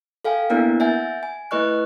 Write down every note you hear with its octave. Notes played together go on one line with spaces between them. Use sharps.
A4 F5 G5 G#5
A#3 B3 D4 E4 A#4
E5 F#5 G#5 G6 A6
G#5
A3 E4 B4 D#5 C#6 F#6